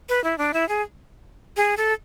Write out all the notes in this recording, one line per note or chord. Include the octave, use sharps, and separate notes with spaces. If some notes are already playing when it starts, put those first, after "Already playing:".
B4
E4
D4
E4
G#4
G#4
A4